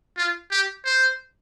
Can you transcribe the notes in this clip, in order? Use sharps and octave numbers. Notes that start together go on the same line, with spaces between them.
F4
G4
C5